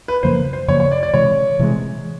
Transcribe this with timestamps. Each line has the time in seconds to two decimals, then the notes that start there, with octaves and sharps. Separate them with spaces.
0.08 B4
0.23 F#2 C#3 F3 A#3 C5
0.53 C5
0.68 F#2 C#3 F3 A#3 C#5
0.80 C#5
0.92 D5
1.03 D5
1.14 C3 E3 G#3 C#5
1.59 C3 E3 G#3